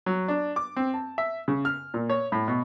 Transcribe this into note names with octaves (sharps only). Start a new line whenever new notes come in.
F#3
D4
D6
C4
A5
E5
C#3
F6
A#2
C#5
A2
B2